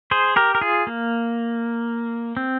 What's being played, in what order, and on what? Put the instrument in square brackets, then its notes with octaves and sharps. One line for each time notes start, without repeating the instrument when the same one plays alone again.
[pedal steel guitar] G#4 C5
G4 A#4
A#4
F4 G#4
A#3
C4